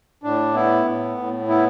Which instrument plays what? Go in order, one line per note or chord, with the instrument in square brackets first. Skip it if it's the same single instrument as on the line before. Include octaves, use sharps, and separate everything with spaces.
[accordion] A2 D4
B3 E4
A2
A2
B3 E4